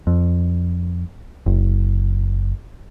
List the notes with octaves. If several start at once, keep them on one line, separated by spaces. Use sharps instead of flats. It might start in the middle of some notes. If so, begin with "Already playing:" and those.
F2
F#1